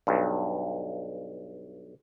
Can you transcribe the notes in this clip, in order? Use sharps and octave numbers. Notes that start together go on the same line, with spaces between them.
B1 G2